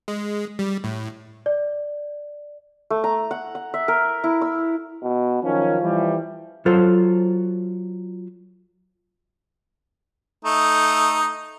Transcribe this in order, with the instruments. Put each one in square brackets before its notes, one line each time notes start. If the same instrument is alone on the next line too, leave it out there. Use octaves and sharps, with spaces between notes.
[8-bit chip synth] G#3
G3
A2
[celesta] D5
[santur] A3
A#5
F#5
F#5
E5
A#4
E4
E6
[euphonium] B2
[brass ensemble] F#2 D#3 C#4 [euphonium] F3
[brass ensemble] E3 G3
[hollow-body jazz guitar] F#3 F4 A4 C5
[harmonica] A3 D#4